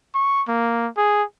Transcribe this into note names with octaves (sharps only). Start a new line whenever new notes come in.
C#6
A#3
G#4